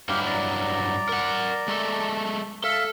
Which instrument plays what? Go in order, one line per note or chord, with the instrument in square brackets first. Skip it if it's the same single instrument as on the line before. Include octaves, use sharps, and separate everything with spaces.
[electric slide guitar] G2 F#3 E4 [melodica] G4 F5
[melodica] D5 A#5
[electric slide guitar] A#4 F#5
G#3 A3 A4
[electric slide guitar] A4 [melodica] E5 F5